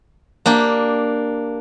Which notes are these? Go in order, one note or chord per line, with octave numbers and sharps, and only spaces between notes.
A#3 D4 G4